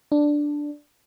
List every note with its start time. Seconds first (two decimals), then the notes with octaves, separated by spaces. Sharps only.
0.12 D4